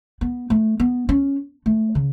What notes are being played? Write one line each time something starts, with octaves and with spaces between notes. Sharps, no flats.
B3
A3
B3
C#4
A3
C#3